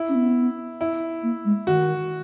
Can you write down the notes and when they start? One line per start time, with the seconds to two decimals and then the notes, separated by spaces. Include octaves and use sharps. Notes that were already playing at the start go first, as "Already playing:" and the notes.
Already playing: E4
0.09 C#4
0.15 B3
0.81 E4
1.23 A#3
1.45 G#3
1.67 D#3 F#4